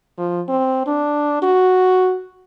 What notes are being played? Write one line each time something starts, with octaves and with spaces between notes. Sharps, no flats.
F3
C4
D4
F#4